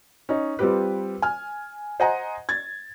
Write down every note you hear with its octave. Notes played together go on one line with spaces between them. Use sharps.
C#4 D#4
G3 C4 F4 G4 B4
G#5 F6
C5 D#5 F#5 G#5 A#5
G#6 A6